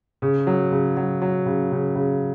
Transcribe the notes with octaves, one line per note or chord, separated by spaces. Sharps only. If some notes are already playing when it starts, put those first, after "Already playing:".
C#3
F#3
C#3
F#3
F#3
C#3
C#3
C#3